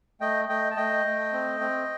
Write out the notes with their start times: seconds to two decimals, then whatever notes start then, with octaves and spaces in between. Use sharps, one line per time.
0.21 A3 D#5 G5
0.49 A3 D#5 G5
0.71 A5
0.77 A3 D#5 G5
1.05 A3
1.33 C4
1.60 C4